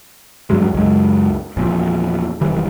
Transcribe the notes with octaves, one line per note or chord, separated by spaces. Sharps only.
E2 G2 F#3 G#3
C#2 F#2 G#3
E2 A#2 F3
F1 D#3 E3 G3